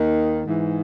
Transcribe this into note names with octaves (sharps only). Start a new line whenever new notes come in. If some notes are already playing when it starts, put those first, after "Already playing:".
Already playing: D#2 D#3
G#2 E3